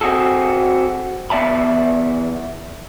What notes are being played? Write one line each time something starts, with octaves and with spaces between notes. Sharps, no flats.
C4 F#4 G#4 A4
E2 B3 D5 E5 A5 B5